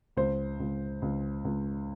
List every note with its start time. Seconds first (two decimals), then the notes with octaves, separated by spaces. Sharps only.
0.17 C#2 C5
0.59 C#2
1.02 C#2
1.44 C#2